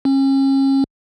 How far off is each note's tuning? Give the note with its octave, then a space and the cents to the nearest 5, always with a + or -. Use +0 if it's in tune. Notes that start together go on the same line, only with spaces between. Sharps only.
C#4 -35